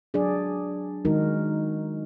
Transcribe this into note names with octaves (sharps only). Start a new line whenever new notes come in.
F#3 D4 G#4 D5
D#3 G#3 D#4 F#4 A#4